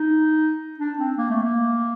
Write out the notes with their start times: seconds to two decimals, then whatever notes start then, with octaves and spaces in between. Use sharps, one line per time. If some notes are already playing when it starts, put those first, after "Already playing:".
Already playing: D#4
0.80 D4
0.99 C4
1.18 A#3
1.30 A3
1.42 A#3